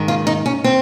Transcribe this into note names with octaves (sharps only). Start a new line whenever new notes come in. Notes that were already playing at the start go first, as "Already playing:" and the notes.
Already playing: G#2 D#3
F4
D#4
C#4
C4